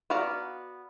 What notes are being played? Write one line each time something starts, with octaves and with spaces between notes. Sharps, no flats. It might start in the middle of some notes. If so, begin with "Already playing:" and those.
B3 F#4 D5 F5 A#5